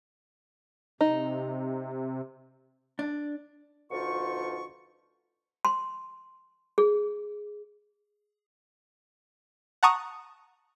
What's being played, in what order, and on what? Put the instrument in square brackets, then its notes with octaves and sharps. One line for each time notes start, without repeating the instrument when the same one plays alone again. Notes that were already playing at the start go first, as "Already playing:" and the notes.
[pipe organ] C3 [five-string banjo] D#4
[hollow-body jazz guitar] D4
[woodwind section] D2 B2 F3 D#4 F4 C#6
[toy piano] C6
G#4
[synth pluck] F#5 A5 A#5 C#6 D#6